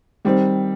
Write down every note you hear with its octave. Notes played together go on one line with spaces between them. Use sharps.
D#3 G3 C4